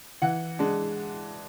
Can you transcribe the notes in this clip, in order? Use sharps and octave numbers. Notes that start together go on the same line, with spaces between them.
E3 F#5
G#3 D4